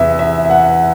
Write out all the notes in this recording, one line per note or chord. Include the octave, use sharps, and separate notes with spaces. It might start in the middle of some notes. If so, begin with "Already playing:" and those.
Already playing: E2 C3 E3 E5
E5
E5
F#5